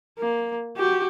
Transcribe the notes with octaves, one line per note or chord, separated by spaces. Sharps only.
A#3
F#4 G4